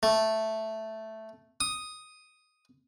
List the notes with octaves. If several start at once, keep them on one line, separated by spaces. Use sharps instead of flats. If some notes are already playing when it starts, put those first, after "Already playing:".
A3
D#6